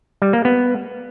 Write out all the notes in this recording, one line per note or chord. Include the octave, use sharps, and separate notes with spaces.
G3
A#3
B3